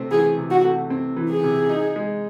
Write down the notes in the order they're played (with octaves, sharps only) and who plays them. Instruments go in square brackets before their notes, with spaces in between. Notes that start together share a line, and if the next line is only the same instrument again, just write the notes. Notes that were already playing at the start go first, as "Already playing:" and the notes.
Already playing: [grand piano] C3 A3 C4
[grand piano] E3 [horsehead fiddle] G#4
[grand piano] C3
[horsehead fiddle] F#4
[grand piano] A3
C4
E3
[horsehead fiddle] G#4
[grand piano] C3
D#4
G#3